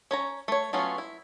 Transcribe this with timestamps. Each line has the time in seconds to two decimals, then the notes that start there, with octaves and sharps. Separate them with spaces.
0.11 C#4 C#5 A#5
0.48 A3 C#5
0.73 F#3 A3 B3 C#4 F4
0.98 E4